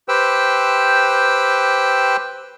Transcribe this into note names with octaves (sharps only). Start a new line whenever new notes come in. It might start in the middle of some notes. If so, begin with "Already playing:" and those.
G4 B4 C5 G5 E6